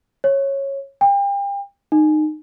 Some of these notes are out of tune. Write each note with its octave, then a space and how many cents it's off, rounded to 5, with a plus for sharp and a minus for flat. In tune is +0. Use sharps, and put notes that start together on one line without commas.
C#5 -15
G5 +35
D#4 -25